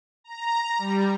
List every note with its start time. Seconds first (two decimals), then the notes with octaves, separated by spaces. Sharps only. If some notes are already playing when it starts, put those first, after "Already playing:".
0.24 A#5
0.79 G3